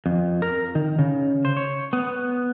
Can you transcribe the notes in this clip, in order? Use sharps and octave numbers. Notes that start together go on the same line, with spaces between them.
F2
A#4
D#3
C#3
C5
C#5
B3